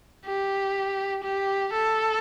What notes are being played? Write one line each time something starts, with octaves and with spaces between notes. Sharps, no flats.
G4
G4
A4